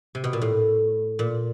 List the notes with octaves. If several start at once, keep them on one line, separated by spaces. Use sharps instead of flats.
C3
B2
A#2
A2
A#2